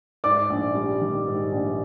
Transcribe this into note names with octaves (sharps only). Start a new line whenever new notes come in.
G#2 D5 D6
A#1
G3
D#3
G#2
A#1